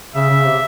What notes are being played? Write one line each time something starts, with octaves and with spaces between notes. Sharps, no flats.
C#3 E5
C#3
C3